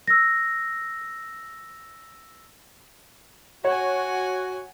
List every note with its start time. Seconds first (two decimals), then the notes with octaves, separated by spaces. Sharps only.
0.07 E6 A#6
3.64 F#4 C#5 F#5 G#5